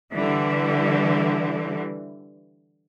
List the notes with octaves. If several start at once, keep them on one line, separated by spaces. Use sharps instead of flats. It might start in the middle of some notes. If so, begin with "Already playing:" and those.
D3 E3 G3